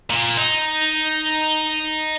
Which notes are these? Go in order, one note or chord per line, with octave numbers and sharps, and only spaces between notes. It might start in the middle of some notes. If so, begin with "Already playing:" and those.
A#2
D#4